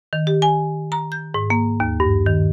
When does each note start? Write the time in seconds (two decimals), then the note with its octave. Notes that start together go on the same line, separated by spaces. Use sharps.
0.13 D#3
0.27 G4
0.42 G#5
0.92 A#5
1.12 G6
1.34 G#2
1.50 A#3
1.80 D#2
2.00 G2
2.26 D#3